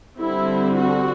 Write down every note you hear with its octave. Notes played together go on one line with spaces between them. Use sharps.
D3 G3 C4 E4
F#4